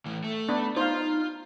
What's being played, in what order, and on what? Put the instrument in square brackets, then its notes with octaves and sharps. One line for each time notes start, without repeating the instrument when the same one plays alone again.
[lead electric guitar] A2 E3
A3
[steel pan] B3 D4 [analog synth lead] B5
[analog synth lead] D#4 [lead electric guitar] F4 [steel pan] C5 F5